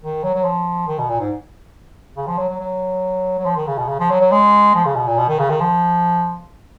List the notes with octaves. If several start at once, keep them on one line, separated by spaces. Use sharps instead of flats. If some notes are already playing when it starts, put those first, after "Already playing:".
D#3
F#3
F#3
F3
D#3
B2
A#2
G#2
C#3
F3
F#3
F#3
F#3
F#3
F3
D#3
C#3
B2
C#3
F3
F#3
F#3
G#3
F3
C#3
B2
A#2
B2
D#3
C#3
D#3
F3